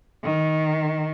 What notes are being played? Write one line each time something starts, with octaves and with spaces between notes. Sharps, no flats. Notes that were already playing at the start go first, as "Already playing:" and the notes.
D#3